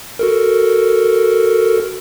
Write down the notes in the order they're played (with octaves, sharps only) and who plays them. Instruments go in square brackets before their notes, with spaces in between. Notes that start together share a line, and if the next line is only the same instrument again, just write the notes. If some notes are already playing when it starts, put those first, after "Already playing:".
[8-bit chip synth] F#4 A4 A#4